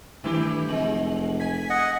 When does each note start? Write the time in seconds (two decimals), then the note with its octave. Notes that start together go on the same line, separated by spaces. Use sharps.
0.24 G2 D#3 E3 A3 E4 G4
0.69 F1 G#3 F#7
1.40 G#5 G#6 B6
1.70 D#5 F#5